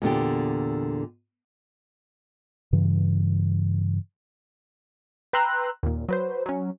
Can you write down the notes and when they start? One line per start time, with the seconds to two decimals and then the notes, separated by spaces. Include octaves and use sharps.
0.02 E2 A#2 D3 G4
2.73 G2 C#3 E3
5.33 B4 G5 A#5 C6 E6 F#6
5.83 D#2 A#2
6.08 F#3 B4 C5
6.46 F#3 C#4